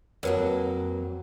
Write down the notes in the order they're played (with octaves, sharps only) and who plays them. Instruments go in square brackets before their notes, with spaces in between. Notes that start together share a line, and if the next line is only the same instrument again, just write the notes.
[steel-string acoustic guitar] F2 F#3 A#3 [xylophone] A#4 B4 C#5